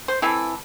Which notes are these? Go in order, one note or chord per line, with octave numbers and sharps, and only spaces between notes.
C5
E3 C4 E4 A4